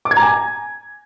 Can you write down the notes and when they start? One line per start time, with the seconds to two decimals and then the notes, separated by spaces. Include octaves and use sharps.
0.05 D6
0.11 G#6
0.17 A#5
0.22 G#5